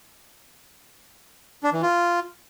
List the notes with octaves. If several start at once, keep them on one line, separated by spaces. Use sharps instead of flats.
D4
E3
F4